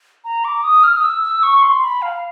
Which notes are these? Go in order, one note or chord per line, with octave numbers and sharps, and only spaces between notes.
A#5
D6
D#6
F6
D#6
E6
E6
C#6
C6
B5
F5